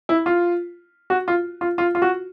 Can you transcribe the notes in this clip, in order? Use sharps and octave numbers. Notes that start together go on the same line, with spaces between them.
E4
F4
F#4
F4
F4
F4
F4
F#4